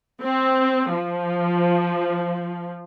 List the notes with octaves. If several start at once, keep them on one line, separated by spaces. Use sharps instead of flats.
C4
F3